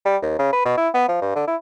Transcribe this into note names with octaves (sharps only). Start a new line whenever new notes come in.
G3
D#2
C#3
B4
B2
E4
B3
F3
G2
D3
E4